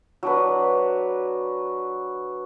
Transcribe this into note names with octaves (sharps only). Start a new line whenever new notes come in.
F#3 D4 B4